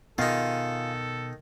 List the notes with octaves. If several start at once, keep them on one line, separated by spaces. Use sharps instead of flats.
B2 D#3 B3 D#4 F4 G#4 A4 F5